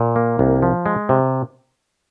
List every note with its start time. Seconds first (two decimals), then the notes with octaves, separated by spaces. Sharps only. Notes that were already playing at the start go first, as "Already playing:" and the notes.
Already playing: A#2
0.16 A#3
0.39 C2
0.62 F3
0.86 G#3
1.09 C3